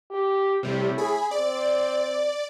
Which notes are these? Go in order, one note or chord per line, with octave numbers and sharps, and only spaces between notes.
G4
A2 C3 G3
G#4 B5
C4 D5